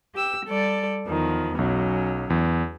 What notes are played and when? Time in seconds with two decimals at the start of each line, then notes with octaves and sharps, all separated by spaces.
0.14 G4 E6
0.45 G3 A4 D5
1.06 E2 D#3 F3
1.58 B1 F#3 C#4
2.30 E2